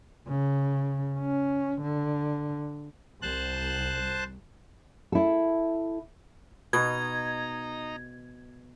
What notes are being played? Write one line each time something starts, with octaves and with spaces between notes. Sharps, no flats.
C#3
C#4
D3
C2 C5 A5 F#6
E4 A4
B2 D#4 A#5 G#6